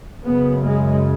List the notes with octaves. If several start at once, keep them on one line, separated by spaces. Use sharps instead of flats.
F#2 C#3 B3
G#3